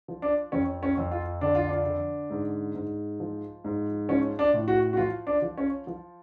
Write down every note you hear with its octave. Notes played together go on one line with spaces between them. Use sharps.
F3
D4
F2 C#4
C#4
F2
F4
D3 D4
F4
D4
D3
G#2
G#2
F3
G#2
F3 C#4
D4
A2
F#4
F#4
F3 F4
D4
F3
C#4
F3